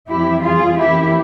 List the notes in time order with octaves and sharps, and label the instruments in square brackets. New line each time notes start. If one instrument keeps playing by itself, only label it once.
[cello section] F2 E3 G3 C4 E4 G4
F4 G#4
F2 E3 A#3 C#4 E4 G4